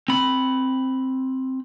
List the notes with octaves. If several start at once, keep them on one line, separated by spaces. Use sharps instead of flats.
C4 B5